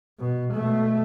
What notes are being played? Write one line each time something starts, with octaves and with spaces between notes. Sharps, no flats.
B2
B2 A3